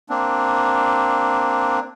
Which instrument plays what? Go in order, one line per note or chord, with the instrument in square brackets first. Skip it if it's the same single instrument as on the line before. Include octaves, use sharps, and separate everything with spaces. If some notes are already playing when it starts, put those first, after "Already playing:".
[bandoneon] A#3 C4 D4